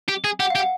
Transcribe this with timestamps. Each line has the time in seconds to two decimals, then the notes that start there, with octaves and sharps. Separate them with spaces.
0.09 G4
0.24 G#4
0.40 G4 F#5
0.50 G4 F5
0.60 F#5